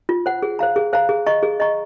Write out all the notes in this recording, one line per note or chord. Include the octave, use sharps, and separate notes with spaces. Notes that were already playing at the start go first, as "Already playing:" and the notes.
F4
C5 F#5
G#4
C5 F5 A#5
G#4
C5 F5 A#5
G#4
D#5 A#5 C#6
G#4
D#5 A#5 C#6